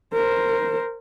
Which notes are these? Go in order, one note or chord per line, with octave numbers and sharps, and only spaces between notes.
A#4 C5